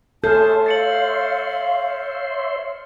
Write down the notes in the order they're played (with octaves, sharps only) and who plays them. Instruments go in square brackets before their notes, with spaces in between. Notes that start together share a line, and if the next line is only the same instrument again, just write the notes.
[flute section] G#4 A5 [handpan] A4 [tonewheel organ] C#5 E5 C6 [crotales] F6 G6
[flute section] F5 [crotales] A6 C#7 F#7